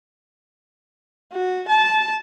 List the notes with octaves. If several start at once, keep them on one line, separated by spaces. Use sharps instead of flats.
F#4
A5